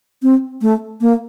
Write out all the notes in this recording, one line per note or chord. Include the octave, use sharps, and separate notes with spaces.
C4
A3
A#3